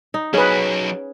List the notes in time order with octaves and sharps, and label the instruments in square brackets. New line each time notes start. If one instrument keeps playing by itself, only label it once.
[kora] D#4
[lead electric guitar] F#3 D#4 [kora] C#4 [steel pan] G#4 B4